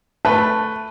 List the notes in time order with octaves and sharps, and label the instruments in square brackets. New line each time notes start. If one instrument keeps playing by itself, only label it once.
[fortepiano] A3 B4 [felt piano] A5